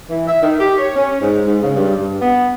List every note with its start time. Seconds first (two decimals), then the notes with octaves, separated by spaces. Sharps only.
0.09 E3
0.27 E5
0.42 D#3
0.60 G4
0.77 C#5
0.96 C#4
1.21 G#2
1.46 G#2
1.61 C#3
1.76 G2
1.97 G2
2.20 B3